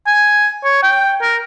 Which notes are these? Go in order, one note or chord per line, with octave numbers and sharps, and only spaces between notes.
G#5
C#5
G5
A#4